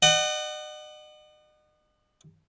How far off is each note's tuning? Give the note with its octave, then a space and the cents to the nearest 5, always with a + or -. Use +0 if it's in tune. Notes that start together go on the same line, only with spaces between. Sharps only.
D#5 -40 F#5 +20